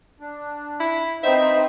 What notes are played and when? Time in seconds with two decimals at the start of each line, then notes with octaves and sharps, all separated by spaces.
0.20 D4
0.80 E4
1.24 C4 D#4 B4 C5 D#5 E5